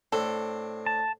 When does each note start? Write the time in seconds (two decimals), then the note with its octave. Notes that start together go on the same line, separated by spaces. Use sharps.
0.12 A2 C4 D4 A4
0.86 A5